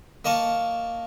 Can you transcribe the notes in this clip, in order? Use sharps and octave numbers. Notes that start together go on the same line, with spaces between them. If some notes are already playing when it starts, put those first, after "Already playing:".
A#3 D#5 A5 C#6